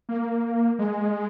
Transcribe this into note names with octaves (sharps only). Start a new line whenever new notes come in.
A#3
G#3